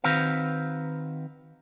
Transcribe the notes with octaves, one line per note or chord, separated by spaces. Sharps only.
D#3 C4 F#4 B4 F5